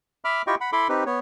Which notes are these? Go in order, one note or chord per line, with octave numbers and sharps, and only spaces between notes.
E5 B5 D6 F6
E4 F4 G4 D#5 G5 C#6
F#5 B5
E4 A4 B5 C6 D6
C4 D#4 G4 B4
B3 C#5